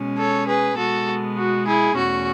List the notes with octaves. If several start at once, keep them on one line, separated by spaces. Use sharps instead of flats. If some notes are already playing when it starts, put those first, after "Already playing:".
Already playing: B2 G#3 C#4
A4 C#5
G#4 B4
B2 G#3 B3 F#4 A4
F#4
E4 G#4
E2 B2 A3 C#4 F#4